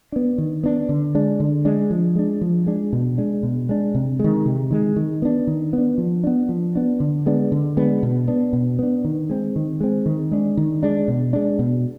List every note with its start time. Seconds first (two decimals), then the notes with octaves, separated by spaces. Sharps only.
0.12 B3 D4
0.38 D#3
0.63 B3 D4
0.89 D3
1.15 G#3 D4
1.40 D3
1.65 G#3 D4
1.91 F3
2.16 G#3 D4
2.41 F3
2.67 G#3 D4
2.93 B2
3.18 G#3 D4
3.43 B2
3.69 G#3 D4
3.95 C3
4.19 D#3 G#3
4.46 C3
4.71 D#3 G#3
4.96 D#3
5.22 B3 D4
5.47 D#3
5.73 B3 D4
5.98 F3
6.24 B3 D4
6.49 F3
6.75 B3 D4
7.00 D3
7.26 G#3 B3 D4
7.52 D3
7.77 G#3 B3 D4
8.03 B2
8.28 B3 D4
8.53 B2
8.79 B3 D4
9.04 D#3
9.30 G#3 C4
9.56 D#3
9.81 G#3 C4
10.06 D#3
10.31 G#3 D4
10.57 D#3
10.83 G#3 D4
11.08 B2
11.33 G#3 D4
11.59 B2